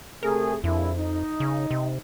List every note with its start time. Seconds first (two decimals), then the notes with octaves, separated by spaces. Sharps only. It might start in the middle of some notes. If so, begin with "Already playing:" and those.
0.23 C3 A3 G#4 A#4
0.64 A#1 F2 E4
0.99 D#4
1.40 C#3
1.71 C3